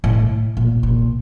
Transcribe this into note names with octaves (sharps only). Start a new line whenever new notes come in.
A2
A#2
A#2